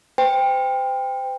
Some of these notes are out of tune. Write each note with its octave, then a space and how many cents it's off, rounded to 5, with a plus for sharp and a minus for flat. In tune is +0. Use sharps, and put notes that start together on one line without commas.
C5 -40 G5 +15